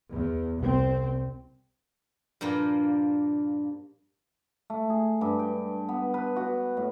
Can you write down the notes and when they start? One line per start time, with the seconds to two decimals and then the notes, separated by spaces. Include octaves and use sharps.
0.11 E2
0.58 C2 C4
2.41 G2 A#2 F3 A#3
4.70 A3
4.90 G#4
5.21 G2
5.39 G5
5.89 B3
6.14 B4
6.36 F#4
6.77 A2